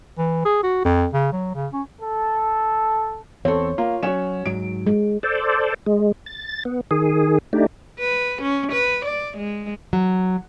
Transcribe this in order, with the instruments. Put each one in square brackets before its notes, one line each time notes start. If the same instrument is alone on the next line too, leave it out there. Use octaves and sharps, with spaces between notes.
[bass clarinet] E3
G#4
F#4
F2
C#3
F#3
C#3
C#4
[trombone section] A4
[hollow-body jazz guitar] E2 [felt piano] C4 A4 [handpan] C#5
[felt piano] A#3 [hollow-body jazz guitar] F4
[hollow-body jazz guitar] F#3 F#4 [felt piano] C#4 E7
[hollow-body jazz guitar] G#2 F#3 [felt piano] D7
[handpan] G#3
[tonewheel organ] A4 C5 D5
G#3
A6
B3
D#3 G#4
A3 D4 D#4 G4
[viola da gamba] B4
C#4
B4
D5
G#3
[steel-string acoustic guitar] F#3